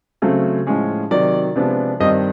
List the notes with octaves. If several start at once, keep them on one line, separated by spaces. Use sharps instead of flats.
C#3 F#3 A3 C4
A2 F3 G#3 C#4
C3 D#3 F#3 D5
C3 F3 G#3 B3 D4
G2 D#3 G3 C4 D#5